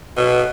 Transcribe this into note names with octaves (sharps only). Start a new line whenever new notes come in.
B2